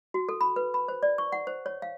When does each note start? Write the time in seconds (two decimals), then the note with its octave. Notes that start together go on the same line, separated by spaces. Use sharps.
0.14 F#4
0.29 A4
0.41 B5
0.56 B4
0.74 B5
0.88 C5
1.03 D5
1.18 C#6
1.32 F#5
1.47 C5
1.66 C#5
1.82 F5